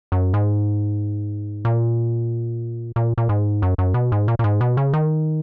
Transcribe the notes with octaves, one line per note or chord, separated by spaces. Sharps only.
F#2
G#2
A#2
A#2
A#2
G#2
F#2
F#2
B2
G#2
A#2
A#2
G#2
B2
C#3
D#3